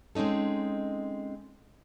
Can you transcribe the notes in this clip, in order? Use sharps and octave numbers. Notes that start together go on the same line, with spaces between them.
G#3 C4 C#4 D#4 A4